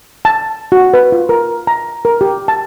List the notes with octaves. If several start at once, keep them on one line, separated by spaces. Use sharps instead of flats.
A5
F#4
B4
F4
A#4
A#5
A#4
G4
A5